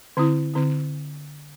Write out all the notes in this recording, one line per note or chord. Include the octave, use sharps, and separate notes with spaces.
D3 C4 E4
D3 C4 E4